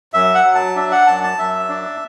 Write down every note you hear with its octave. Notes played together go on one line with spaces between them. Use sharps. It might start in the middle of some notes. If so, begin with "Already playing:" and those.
F#2 E5
F#5
F#3
A5
D4 E5
F#5
F#2 A5
A5
F#2 E5
D4